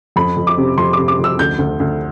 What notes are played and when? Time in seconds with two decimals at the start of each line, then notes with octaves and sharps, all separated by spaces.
0.16 F2 B5
0.37 F2
0.47 D6
0.57 C3
0.78 F2 C6
0.93 C3 D6
1.08 D6
1.19 F2
1.24 E6
1.39 D2 G6
1.59 D2
1.80 D2